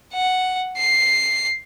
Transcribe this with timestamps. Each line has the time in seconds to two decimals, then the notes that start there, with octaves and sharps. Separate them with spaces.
0.14 F#5
0.78 C7